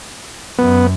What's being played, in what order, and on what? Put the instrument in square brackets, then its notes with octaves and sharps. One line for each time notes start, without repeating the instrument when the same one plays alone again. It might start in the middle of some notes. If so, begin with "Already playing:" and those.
[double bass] F#2 [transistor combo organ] B3